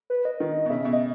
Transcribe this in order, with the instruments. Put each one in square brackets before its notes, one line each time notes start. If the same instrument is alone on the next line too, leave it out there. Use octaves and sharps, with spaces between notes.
[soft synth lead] B4
D#5
[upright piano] D#3
B2
[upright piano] C#3 [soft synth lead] E5
[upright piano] B2 [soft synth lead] E5
[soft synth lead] D#5